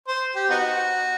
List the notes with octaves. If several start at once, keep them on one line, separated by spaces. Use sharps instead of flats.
C5
G4
B3 D#4 F#4